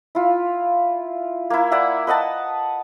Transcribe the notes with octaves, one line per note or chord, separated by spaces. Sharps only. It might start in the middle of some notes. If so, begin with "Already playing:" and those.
E4 F4
A#3 E4
D5 E5 F#5 G#5
B4 D#5 F#5 A5